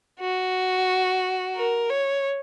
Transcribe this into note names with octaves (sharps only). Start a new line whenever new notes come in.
F#4
A#4
C#5